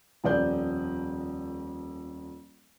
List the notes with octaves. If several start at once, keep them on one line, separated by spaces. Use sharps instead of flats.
D#1 F2 D5 G6